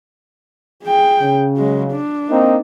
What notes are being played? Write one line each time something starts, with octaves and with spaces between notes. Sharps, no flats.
G#4 G5
C#3
F#3 G#3
D4
A#3 C4 D#4